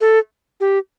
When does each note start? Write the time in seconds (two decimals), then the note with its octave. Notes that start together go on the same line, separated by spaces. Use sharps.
0.01 A4
0.61 G4